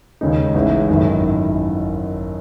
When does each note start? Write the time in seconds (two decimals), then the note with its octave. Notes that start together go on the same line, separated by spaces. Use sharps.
0.21 D#2 C#3 G#3 D#4
0.54 A1 A2 G#3
0.89 G#1 F#2 D#3 A3 E4